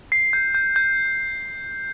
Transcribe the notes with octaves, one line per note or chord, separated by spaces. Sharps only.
C7
G6
G6
G6